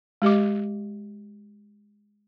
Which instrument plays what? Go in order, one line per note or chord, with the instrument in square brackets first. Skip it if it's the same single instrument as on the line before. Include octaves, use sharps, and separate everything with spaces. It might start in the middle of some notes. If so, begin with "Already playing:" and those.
[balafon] G#3 G4 D#5 D6